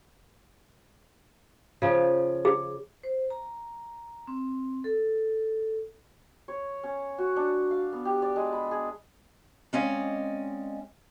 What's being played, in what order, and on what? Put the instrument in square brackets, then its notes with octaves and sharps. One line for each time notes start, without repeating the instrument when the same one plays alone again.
[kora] C#3 F3
[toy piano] G#4
[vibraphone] C5
A#5
C4
A4
[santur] C#5
C#4
F#4
D4
F5
B3
G4
D5
G#3
B5
G#4
[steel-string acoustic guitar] G#3 C4 C#4 D5 D#5 F5